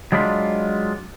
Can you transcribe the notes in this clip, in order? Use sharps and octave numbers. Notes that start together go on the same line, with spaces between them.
F#3 G#3 D4 F4 B5